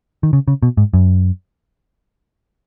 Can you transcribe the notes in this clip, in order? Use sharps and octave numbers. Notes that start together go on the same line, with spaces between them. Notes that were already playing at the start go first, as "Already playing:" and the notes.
D#3
C#3
C#3
B2
G#2
F#2